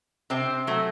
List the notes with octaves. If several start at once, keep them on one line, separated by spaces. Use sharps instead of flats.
C3 C4
F#3 A3